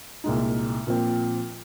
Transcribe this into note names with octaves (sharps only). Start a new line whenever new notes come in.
C2 A#2 G#3 D#4
A#2 F3 C4